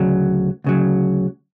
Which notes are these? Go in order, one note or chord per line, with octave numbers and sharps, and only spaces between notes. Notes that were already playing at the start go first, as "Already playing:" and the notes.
Already playing: D2 C#3 F#3
D2 C#3 F#3